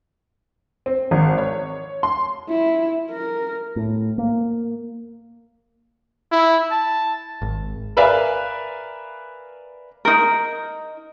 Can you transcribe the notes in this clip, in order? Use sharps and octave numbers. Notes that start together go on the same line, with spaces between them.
C4
G#1
C#5
C6
E4
A#4
A2
A#3
E4
A5
G#1
A#4 B4 D5 E5 F5 G#5
D#4 A#4